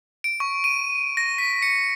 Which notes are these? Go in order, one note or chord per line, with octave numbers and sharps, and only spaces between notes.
D7
C#6
D#7
A#6
B6
C#7